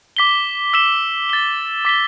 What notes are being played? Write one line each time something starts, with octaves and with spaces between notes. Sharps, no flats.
D6 B6 G7
E6 B6 E7 G7
A6 G7
D6 B6 G7